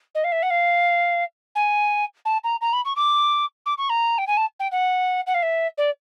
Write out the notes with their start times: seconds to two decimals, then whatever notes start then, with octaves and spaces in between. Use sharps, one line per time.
0.14 D#5
0.24 F5
0.32 E5
0.42 F#5
0.50 F5
1.55 G#5
2.25 A5
2.43 A#5
2.61 A#5
2.72 B5
2.85 C#6
2.96 D6
3.65 D6
3.77 C#6
3.89 A#5
4.18 G5
4.27 G#5
4.37 A5
4.59 G5
4.71 F#5
5.26 F#5
5.34 F5
5.42 E5
5.77 D5